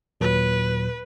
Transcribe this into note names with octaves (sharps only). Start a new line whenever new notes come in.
D#2 A#2 F#3 B4